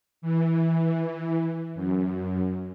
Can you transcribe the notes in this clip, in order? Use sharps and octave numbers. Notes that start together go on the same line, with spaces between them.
E3
F#2